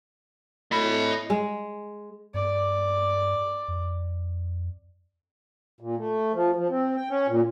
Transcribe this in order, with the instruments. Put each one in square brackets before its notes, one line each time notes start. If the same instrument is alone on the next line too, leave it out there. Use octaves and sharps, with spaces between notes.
[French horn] A2 [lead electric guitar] D#5 B5
[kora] G#3
[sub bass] G2 [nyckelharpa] D5
[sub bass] F2
[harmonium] A#2
A3
F3
F3
C4
G5
C#4
A#2